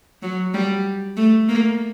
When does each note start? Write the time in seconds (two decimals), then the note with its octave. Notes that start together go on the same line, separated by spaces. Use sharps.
0.22 F#3
0.54 G3
1.17 A3
1.49 A#3